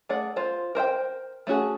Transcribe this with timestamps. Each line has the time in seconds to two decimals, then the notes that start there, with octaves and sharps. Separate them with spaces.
0.09 A3 G#4 D5 F#5
0.36 F4 C5
0.75 A#4 C5 E5 G5
1.47 A3 C#4 F#4 G#4